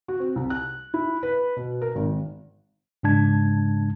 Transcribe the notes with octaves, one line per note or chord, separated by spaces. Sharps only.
F#4
C4
C2
F#6
E4
B4
B2
A#4
G#1
G#2 C#3 G#3 D4 A5 G#6